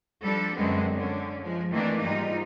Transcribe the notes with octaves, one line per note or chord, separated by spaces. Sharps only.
F3 G3 D4 A4
F#2 D3 G#3 B3 C4
D3 C#4
F3 G#3
D#3 E3 A3 A#3 C4 D4
G#2 G3 D#4 F4